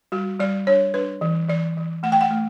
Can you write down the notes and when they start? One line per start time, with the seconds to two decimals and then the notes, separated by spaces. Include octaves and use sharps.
0.12 G3 F#4
0.40 G3 D5
0.67 D4 C#5
0.94 D4 B4
1.21 E3
1.49 E3 D5
1.77 E3
2.03 A3 F#5
2.12 G5
2.21 F#5
2.31 A3